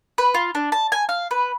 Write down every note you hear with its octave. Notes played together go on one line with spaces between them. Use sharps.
B4
F4
D4
A5
G#5
F5
B4